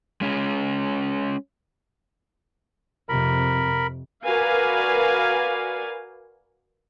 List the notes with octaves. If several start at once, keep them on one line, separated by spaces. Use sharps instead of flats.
G#3 C#4
F2 C3 A#4 B5
F#4 A#4 B4 D5 F5 G#5